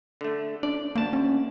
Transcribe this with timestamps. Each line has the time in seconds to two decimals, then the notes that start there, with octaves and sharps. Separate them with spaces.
0.21 D3 A3
0.63 D4 D5
0.95 D2 A#3 A5
1.13 C#4